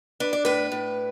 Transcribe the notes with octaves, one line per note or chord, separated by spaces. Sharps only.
D4 B4
D5
A2 B4
A2